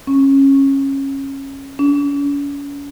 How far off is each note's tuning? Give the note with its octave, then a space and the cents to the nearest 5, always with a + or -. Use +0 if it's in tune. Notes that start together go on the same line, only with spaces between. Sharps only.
C#4 -20
C#4 +40